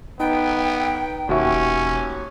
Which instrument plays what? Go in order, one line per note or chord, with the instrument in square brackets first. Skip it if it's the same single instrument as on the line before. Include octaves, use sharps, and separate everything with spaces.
[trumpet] B3 [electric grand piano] D#4 [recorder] G5
[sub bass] E1 [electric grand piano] D#2 F#4 E5 [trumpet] C#4